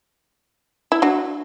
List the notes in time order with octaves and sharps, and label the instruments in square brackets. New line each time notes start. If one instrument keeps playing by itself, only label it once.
[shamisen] E4
D4 F#4